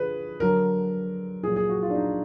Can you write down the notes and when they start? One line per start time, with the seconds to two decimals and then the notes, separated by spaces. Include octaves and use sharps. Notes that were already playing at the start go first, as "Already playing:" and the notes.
Already playing: D3 F3 G#4 B4
0.40 D3 F#3 A#4
1.43 A#2 G#4
1.48 F#3
1.56 G#4
1.69 F#4
1.82 F4
1.90 D4
1.95 D#4